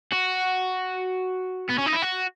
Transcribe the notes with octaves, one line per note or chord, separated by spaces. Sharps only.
F#4
B3
C#4
D#4
E4
F#4